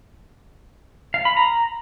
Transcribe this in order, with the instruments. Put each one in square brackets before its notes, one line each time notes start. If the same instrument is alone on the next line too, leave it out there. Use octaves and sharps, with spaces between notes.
[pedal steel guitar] F5
B5
A#5